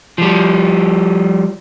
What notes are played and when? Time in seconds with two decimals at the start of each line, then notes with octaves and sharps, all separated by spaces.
0.18 F3 G3